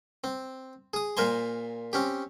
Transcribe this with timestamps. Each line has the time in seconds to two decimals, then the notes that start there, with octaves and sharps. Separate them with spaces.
0.24 C4
0.94 G#4 D#6
1.17 A#2 A#4 C5 G#5 C6
1.93 C4 C#4 G4